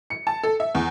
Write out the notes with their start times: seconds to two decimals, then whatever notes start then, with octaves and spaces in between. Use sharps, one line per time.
0.10 C#7
0.27 A5
0.43 A4
0.60 E5
0.75 E2